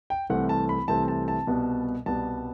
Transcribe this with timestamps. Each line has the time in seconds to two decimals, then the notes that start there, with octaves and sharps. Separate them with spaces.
0.10 G5
0.30 C2 C3 E3 A3 C4 F#5
0.49 A5
0.69 B5
0.88 C2 C3 E3 A3 C4 A5
1.08 A5
1.28 A5
1.47 C2 B2 G3 B3
2.06 C2 B2 G3 B3 A5